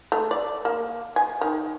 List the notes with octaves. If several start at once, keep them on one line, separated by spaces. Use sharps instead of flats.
A3
D5
A#3
G#5
D#3